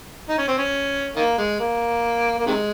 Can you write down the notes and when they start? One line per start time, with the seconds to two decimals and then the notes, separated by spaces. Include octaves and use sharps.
0.29 D#4
0.38 C#4
0.48 C4
0.58 C#4
1.16 D#3 A#3
1.38 G#3
1.60 A#3
2.39 A#3
2.47 C3 D#3 G#3